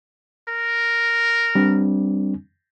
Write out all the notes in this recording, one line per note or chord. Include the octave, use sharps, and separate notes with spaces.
A#4
G3 C4 D4